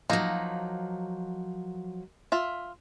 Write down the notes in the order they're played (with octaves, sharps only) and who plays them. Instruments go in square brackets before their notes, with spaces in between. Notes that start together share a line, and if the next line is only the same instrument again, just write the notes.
[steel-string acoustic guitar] F3 F#3 [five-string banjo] A#3 D#4
[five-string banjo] F4 E5